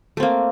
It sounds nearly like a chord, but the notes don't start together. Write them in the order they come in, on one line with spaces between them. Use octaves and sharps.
A3 C4 A#3